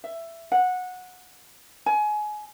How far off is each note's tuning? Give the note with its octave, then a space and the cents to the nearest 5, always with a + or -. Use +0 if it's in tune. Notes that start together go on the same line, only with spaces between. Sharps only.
E5 +15
F#5 -15
G#5 +25